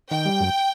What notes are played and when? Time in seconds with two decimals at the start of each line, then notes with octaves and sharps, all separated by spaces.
0.11 D#3 G5
0.25 G3
0.40 F#2